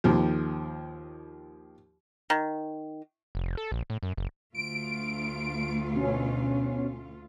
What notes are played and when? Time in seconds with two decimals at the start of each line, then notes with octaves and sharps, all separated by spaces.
0.04 D#2 D#3 F3
2.30 D#3
3.35 F1
3.57 A4
3.72 A#1
3.90 A2
4.03 F#2
4.17 F#1
4.55 D2 A3 F4 D7
5.94 B2 C#4